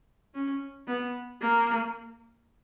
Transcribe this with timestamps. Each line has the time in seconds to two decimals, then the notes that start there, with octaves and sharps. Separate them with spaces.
0.35 C#4
0.87 B3
1.41 A#3